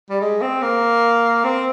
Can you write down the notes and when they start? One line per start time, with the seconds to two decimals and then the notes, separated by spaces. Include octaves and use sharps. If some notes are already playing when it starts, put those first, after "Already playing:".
0.10 G3
0.21 G#3
0.42 C4
0.62 A#3
1.44 C4